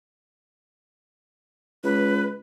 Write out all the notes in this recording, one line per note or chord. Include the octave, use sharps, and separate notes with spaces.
C#2 B4